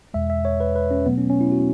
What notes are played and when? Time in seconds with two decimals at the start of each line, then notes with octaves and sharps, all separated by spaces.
0.14 E2 B2 G#3 E5
0.30 E5
0.45 C#5
0.60 B4
0.76 B4
0.91 C#4
1.06 B2 F#3 A3 B3
1.18 C#4
1.30 C#4
1.41 E4
1.52 F#4